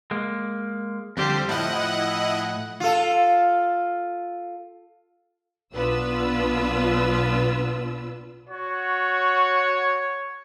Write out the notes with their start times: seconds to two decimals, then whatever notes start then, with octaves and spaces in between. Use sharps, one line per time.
0.11 G#3 A#3
1.17 F2 D3 G3 G4 C5
1.48 A2 F3 E4 D#5 F#5
2.80 F4 A4
5.72 B1 B3 D4 F4 B4 E6
8.49 F#4 C#5